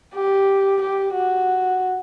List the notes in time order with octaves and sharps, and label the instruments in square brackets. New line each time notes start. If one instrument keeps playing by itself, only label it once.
[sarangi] G4
G4
F#4